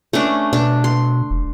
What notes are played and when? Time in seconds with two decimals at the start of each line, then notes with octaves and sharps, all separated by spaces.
0.13 A3 C#4 D4
0.53 B2 D4
0.84 C6
1.31 F1